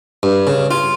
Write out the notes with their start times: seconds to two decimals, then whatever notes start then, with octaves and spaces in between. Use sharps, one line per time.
0.23 G2
0.47 C#3
0.71 F4